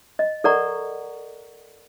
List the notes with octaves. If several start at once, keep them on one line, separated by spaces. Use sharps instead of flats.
D#5
A4 A#4 D5 F#5 A#5 C#6